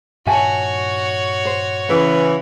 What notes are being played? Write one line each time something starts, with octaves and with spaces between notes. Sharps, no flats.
G2 A#2 D#3 F#4 C#5 E5 G#5 A5
C5
C#3 E3 B4